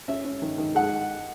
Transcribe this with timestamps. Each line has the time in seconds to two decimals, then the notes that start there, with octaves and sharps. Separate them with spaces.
0.08 C#4 E5
0.25 C#4
0.42 D#3
0.58 D#3
0.75 G#3 F#5